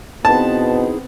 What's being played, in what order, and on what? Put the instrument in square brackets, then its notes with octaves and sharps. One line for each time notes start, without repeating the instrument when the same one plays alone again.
[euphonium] B2 [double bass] B3 C4 [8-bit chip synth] D#4 E4 G#4 [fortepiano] A5